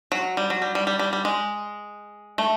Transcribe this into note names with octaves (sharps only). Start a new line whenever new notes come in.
F#3
G3
F#3
G3
G3
G3
G3
G3
G#3
A3